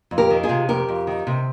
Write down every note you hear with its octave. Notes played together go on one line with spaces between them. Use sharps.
F2
G4 A#4
D#3
F4 G#4
C3
F2 G4 A#4
F2
D#3
C3